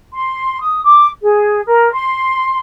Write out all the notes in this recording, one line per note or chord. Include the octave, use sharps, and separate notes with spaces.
C6
D#6
D6
G#4
A#4
C6